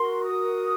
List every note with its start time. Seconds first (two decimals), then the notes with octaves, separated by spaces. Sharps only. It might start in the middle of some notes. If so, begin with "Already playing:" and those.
Already playing: F#4 A#4 C6
0.24 D#6